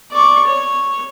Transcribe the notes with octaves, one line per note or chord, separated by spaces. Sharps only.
D5 C#6
C#5